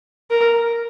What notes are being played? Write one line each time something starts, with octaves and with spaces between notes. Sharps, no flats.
A#4